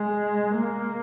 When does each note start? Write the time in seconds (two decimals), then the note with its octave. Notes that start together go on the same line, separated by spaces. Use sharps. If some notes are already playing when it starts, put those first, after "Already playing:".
Already playing: G#3
0.55 A#3